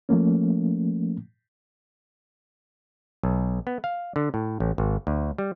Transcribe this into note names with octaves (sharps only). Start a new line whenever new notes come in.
F3 A3 A#3 C#4
B1
B3
F5
D3
A2
A1
G#1
D2
G3